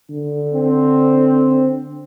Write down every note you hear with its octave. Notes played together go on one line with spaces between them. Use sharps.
D3
C4